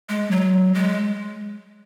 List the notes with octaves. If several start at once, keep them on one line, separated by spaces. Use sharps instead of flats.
G#3
F#3
G#3